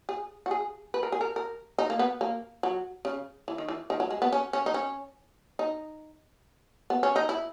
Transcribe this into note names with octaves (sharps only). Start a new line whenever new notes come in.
G#4
F#4
G#4
B4
A#4
G#4
A#4
A#4
D#4
A#3
B3
A#3
F#3
C#3
E3
D#3
E3
D#3
F#3
G#3
B3
C#4
C#4
D#4
C#4
D#4
B3
C#4
D#4
E4